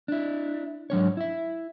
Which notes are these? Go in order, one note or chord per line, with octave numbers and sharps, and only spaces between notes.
D4 E4
G#2 F#3 D4 C#5
E4 E5